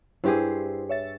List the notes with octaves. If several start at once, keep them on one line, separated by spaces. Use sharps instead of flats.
G2 E4 G4 G#4 C5
C#5 E5 A6